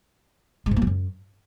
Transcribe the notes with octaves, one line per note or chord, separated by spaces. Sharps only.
G#3
G#2
A#3
F#3
F#2